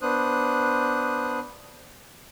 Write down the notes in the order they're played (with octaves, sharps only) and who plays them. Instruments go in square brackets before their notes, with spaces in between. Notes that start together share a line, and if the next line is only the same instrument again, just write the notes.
[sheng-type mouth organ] B3 D4 C5 D#6 F#6